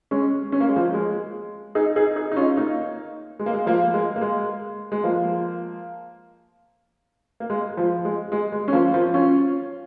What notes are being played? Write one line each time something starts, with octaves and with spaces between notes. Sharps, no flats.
G#3 C#4
C#4
A#3
G#3
F3 A#3
G#3
D#4 G#4
D#4 G#4
D#4 G#4
D#4
C#4 F4
A#3 D#4
G#3
A#3
G#3
F3 A#3
G#3
A#3
G#3
G#3
F3 A#3
A#3
G#3
F3
G#3
G#3
G#3
C#4
F3 A#3
F3 A#3
C#4 F4